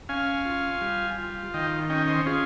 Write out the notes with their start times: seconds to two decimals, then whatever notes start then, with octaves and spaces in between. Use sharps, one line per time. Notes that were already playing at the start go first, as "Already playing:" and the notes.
0.09 C#4 F5 G#5
0.45 F4
0.81 G3
1.18 F4
1.54 D#3 D#5 G5
1.89 C#4 D#5 G5
2.08 C5 D#5
2.26 C#4 F4 G#4